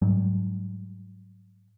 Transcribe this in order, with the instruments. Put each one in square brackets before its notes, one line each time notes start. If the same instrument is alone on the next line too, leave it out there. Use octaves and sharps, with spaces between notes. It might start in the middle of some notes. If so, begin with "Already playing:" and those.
[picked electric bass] G#2 F#3 G3